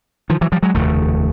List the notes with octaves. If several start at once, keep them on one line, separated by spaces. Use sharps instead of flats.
D#3 F3
E3 F#3
F3 G3
F#3 G#3
F1 D#2 C#3 A3